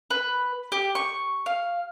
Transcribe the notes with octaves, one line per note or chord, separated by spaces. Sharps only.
B4
G4
C#6
F5